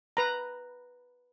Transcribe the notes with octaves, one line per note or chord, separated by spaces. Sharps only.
B4 A#5